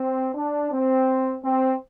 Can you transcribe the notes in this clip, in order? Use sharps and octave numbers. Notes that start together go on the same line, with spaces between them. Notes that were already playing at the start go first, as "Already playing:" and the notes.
Already playing: C4
D4
C4
C4